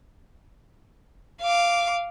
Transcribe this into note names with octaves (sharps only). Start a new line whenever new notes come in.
F5 D6